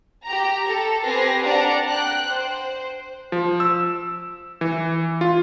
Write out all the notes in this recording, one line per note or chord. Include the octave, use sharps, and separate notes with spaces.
G4 A#5
A4
C4 G4 B4 G#5 A#6 C7
D4 D5 F#5 A5 A#5
G5 F#6
C5
F3
E6
E3
F4